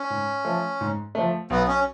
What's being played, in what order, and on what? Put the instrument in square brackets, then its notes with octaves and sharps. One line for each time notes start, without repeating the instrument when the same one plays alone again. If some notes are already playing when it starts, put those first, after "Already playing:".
Already playing: [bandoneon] C#4
[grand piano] G#2
F3 A3
G#2
F3 A3
[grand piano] B1 [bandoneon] B3
[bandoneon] C#4